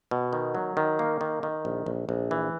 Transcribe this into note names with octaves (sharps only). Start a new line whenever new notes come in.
B2
D#3
F#3
D#3
A#3
D#3
D#3
A#1
A#1
A#1
E3